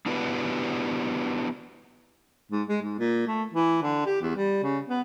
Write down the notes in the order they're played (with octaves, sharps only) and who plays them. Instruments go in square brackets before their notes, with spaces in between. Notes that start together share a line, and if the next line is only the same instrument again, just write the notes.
[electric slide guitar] B3 D4 E4 F#4 G4 B4
[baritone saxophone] G#2
G#3
G#2
A#2
A3
E3
D3
G4
E2
G3
C#3
B3